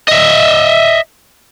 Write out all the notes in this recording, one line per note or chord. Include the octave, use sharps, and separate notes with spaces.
D#5 E5